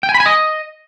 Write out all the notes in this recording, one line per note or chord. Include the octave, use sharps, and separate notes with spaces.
G5
G#5
B5
G#5
D#5